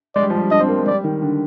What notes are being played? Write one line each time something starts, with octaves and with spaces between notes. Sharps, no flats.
G#3 D5
G3
F3
G3
D4 D#5
C4
A#3
G#3
G3 D5
D#3
D3